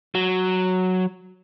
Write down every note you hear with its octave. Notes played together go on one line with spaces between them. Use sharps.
F#3